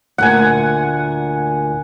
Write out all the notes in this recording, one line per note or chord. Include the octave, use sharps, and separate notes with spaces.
D2 A#2 F#5 G#5